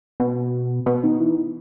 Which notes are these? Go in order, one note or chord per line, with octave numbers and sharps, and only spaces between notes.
B2
B2
D#3
E3